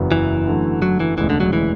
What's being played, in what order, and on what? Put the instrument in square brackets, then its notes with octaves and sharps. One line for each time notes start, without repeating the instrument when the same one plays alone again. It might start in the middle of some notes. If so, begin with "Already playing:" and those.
Already playing: [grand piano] F#1 E2 C#3 F#3 B3
[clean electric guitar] E3
[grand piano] D3 F#3 A3
[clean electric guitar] F#3
E3
[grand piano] E1 D2 C#3 G#3 [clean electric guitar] E3
[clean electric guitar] D3
F#3
E3